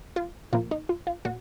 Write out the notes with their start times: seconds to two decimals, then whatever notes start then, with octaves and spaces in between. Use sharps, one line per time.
0.16 F4
0.53 A#2 F3 A#3 F4
0.71 D#4
0.89 F4
1.07 F4
1.25 A#2 F#4